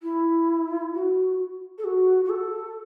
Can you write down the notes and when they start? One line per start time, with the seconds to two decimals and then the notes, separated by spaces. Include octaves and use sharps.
0.02 E4
0.94 F#4
1.78 A4
1.84 F#4
2.24 F#4
2.29 A4